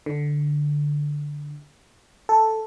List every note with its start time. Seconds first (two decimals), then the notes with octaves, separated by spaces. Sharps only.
0.06 D3
2.29 A4